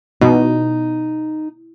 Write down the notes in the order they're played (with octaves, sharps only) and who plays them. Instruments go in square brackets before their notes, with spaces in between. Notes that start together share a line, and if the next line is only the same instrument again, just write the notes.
[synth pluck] B2 [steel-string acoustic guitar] D#4